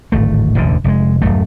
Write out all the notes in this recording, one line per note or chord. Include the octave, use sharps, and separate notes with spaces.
D1 G#1 A3
E1 A1 D2 D3
F1 A#2 G#3
D1 B1 F#2 A3